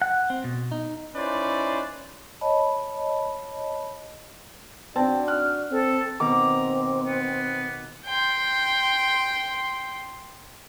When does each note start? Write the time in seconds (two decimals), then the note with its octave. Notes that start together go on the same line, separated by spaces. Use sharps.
0.02 F#5
0.30 C4
0.44 B2
0.72 D#4
1.16 C#4 D#4 E4 B4 C5 D5
2.41 C#5 D#5 A5 B5
4.96 C4 D4 F#4 D5 A5
5.28 F6 F#6
5.71 C4 A4
6.20 B2 D#3 C4 A#5 D6
7.06 B3
8.05 G5 C6